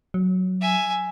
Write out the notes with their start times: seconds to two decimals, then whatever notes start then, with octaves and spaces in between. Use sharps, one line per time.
0.14 F#3
0.61 E5 G#5